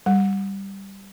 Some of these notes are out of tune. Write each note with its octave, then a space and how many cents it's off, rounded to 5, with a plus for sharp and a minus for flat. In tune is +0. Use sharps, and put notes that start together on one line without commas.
G3 +0